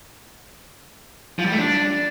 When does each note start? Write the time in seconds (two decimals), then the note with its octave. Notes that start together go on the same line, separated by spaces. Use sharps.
1.39 F3
1.45 G3
1.52 A3
1.59 D4